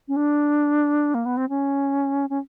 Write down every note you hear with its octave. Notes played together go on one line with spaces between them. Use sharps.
C#4
D4
A#3
B3
C4
C#4
C#4